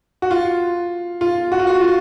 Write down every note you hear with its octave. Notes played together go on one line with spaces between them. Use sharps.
F#4
F4
F4
F#4
F4
F#4
F4